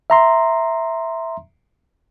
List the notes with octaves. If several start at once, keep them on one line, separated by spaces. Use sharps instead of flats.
E5 A#5 C6